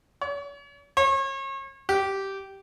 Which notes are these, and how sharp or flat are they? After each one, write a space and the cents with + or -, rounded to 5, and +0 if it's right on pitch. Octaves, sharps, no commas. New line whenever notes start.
C#5 +45
C#5 -35
G4 -10